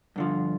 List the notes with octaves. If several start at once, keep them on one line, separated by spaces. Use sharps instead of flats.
G2 D3 F3